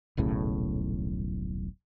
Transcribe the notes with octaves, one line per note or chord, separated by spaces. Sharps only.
D#1 B1 A2 C#3